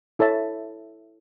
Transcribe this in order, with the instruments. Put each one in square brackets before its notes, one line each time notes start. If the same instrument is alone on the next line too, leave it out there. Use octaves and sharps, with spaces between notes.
[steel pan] E4 A4 C#5 E5 A5